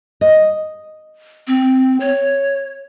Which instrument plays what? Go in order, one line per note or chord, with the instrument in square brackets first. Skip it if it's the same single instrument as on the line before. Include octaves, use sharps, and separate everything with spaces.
[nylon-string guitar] D#5
[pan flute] C4
C#5